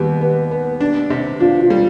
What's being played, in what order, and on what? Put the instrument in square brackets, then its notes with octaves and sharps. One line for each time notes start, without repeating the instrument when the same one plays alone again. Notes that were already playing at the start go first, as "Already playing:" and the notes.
Already playing: [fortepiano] D#2 B3 [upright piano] G3
[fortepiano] B3
B3
D4
C3
[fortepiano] D4 [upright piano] F4
[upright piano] F4
[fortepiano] G3